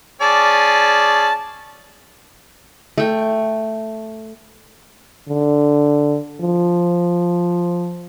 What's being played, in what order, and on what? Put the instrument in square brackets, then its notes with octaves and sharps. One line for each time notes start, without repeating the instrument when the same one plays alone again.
[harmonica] C#4 G#4 D5 [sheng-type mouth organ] A5
[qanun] A3 G5
[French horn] D3
F3